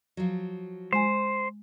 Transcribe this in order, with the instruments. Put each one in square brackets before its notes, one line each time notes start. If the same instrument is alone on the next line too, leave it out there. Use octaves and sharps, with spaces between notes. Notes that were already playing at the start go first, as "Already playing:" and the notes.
[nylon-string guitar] F3 F#3
[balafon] G#3 G#5 [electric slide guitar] C5